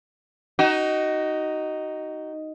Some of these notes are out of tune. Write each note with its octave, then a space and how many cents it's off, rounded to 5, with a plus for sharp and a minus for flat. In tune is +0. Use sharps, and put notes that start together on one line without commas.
D#4 +0 F#4 +30